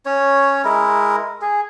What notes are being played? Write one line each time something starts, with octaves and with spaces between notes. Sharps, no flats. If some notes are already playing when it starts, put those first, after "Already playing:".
C#4 C#5
G#3 E4 A#4
G#4